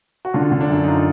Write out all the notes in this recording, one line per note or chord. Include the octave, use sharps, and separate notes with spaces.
F#4
D3 D4 F4
D3
D4
F#2
D#4
D4 F4